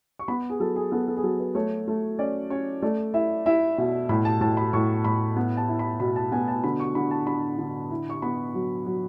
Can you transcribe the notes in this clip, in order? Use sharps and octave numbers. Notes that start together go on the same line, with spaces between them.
C#6
B3 B5
G#4
F#3 A4
G#4
B3 A4
A4
G#4
F#3 A4
B4
A3 C#5
A3
C#4 D5
C#4 C#5
A3 D5
E4 E5
E4 E5
B2 E5
A2 B5
A5
A2 A5
B5
A2 C#6
A2 B5
B3
A5
E4
B5
B2 B5
A5
B3 G#5
A5
D3 B5
C#6
D3 B5
A5
D3 B5
D3
E4
C#6
B3 B5
F#3
F#3